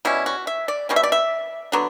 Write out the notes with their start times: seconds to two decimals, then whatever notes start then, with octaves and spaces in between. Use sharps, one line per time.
0.05 B2 G3 C#4 E4
0.26 F#4
0.47 E5
0.68 D5
0.89 B2 G3 C#4
0.96 E5
1.03 D5
1.12 E5
1.72 D3 F#3 B3 D4